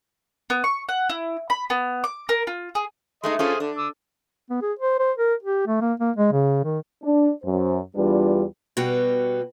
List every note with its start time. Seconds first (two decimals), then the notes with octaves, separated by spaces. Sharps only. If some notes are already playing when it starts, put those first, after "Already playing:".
0.50 B3
0.64 C#6
0.89 F#5
1.10 E4
1.50 B5
1.70 B3
2.04 D6
2.29 A#4
2.47 F4
2.75 G#4
3.24 G#3 A3 D#4 D#5 C6
3.39 C#4 F4 G#4 A4 C5 F5
3.60 D3 D4
3.78 D6 E6
4.50 B3
4.62 G#4
4.79 C5
4.99 C5
5.18 A#4
5.43 G4
5.67 A3
5.81 A#3
6.00 A#3
6.16 G#3
6.32 C#3
6.64 D#3
7.03 D4
7.44 F#2 C5
7.95 E2 G3 D4 F4 B4
8.77 B2 G3 B3 F#4 G5